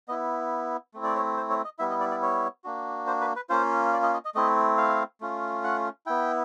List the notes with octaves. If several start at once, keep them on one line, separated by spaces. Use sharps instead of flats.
B3 E4 D#5
A3 C4 E4
D5
C#5
C5
C#5
D#5
G3 B3 E4 E5
D#5
D5
D5
C#5
A#3 D4 F#4
C5
B4
B4
A#3 C#4 F4 C5
D5
D#5
D#5
D#5
A3 C4 E4 D#5
F5
A3 C#4 F4
F#5
B3 E4 G5